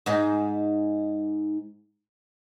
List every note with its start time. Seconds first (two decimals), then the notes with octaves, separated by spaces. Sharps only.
0.06 G#2 D#4